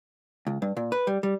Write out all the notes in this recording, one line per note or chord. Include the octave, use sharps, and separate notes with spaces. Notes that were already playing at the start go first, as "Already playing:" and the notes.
C#2
G2
A#2
B4
G3
G3